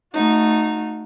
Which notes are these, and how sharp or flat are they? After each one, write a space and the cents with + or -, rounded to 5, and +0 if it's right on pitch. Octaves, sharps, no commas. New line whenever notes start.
A3 +5 D#4 -10 F#4 -30